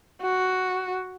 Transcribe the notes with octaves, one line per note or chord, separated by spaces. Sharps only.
F#4